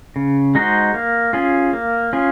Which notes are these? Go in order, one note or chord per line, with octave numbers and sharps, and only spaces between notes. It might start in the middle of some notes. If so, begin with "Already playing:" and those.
C#3
G#3 D#4 F#4 C5
A#3
C#4 F4 G#4
A#3
C#4 F4 G#4